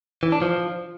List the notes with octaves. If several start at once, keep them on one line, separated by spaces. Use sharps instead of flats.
E3
D4
F3